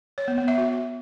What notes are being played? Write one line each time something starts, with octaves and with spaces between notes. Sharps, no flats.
C#5
B3
B3
E5
F#4